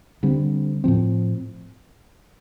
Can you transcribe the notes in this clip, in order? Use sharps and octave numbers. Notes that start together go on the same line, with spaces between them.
D3 G3 C4
A2 F3 C4